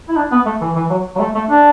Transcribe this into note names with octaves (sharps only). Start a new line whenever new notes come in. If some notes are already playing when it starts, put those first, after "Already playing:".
E4
D4
B3
A3
E3
E3
F#3
F#3
A3
A3
D4